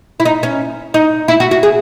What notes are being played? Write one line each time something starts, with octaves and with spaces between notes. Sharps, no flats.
E4
D#4
C#4
D#4
E4
F#4
F#4
G#4